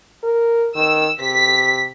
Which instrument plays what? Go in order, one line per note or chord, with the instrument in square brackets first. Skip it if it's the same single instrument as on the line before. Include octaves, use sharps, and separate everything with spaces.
[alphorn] A#4
[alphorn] D#3 [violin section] E6
[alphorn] C3 [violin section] B6